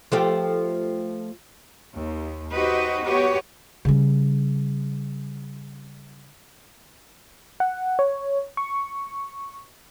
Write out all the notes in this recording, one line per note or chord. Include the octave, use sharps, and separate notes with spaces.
F3 A3 G4
D#2
D#4 F#4 G4 B4 C5 D#5
B3 F#4 G4 B4 C#5
C#3 G3
F#5
C#5
C#6